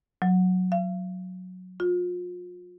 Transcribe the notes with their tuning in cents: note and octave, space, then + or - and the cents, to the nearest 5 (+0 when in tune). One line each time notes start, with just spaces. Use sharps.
F#3 -10
F5 -40
F4 +35